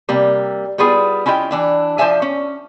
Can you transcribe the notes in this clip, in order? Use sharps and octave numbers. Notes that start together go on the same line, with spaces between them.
C3 G3 A#3
G3 B3 E4 F4 G#4
C#4 E4 F4 D#5 G5
E3 D4 E4
F3 C5 D5 E5 G#5
C#4